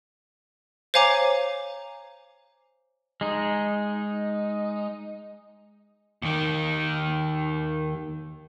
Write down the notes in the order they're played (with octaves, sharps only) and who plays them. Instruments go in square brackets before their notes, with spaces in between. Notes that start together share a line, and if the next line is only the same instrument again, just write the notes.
[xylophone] C5 C#5 F5 G#5 A#5 D6
[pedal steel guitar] G#3 D#4
[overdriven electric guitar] D#2 D#3